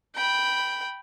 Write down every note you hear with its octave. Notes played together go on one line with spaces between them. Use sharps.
G5 B5